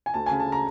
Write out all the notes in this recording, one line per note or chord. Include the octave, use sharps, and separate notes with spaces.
G#5
D2 A5
C#3 G#5
A5
A#5